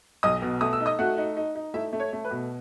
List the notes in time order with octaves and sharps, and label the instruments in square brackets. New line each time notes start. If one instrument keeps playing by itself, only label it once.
[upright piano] B1 D#5 D#6
B2
A3 D#6
E6
D#4
D#5 D#6
A3 F#4 F#5
D#4
D#4
D#4
A3 E4 E5
A3
C#5
A3
B4
B2